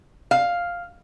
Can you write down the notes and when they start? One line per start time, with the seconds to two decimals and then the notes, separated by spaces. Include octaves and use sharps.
0.31 F5